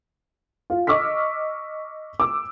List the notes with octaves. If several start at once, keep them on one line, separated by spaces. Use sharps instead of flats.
F4
D#5 C#6 D6 E6 F6 B6
D6 E6